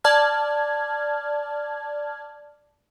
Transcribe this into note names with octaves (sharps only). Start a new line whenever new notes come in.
D5 A5 F6 G#6